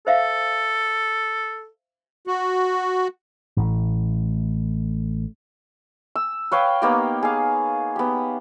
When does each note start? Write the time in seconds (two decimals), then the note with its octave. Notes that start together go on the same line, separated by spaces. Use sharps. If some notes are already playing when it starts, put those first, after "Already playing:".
0.07 A4 C5 E5 F5
2.27 F#4
3.57 A1 A2
6.16 E6
6.52 B4 C#5 F5 G5
6.82 A#3 B3 D#4 G4
7.23 G#4 F5
7.96 B3 G4